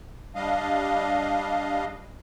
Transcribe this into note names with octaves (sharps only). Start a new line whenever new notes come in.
G3 D4 D#5 F5